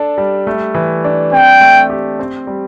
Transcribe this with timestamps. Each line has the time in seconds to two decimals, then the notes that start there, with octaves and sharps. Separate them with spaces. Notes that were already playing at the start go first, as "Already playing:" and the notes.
Already playing: D4 A4
0.18 G3
0.47 A3
0.75 E3
1.04 D4
1.32 C4 G5
1.61 A3
1.90 G4
2.19 C4
2.47 G3